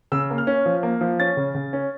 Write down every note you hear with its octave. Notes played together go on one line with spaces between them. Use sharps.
C#3 E6
A#3
F6
C#4
F3
A#3
F3
C#4 A6
C#3
C#3
C#4